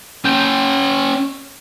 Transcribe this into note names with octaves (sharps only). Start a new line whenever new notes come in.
C#4 G5